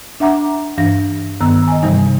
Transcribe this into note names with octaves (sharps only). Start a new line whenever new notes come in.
D4 E5 F#5 A#5 D6
G2 E3 D4 F5 A#6
G2 D#3 B3 A#5 E6
D#5 G#5
G2 C3 E3 G3 D#4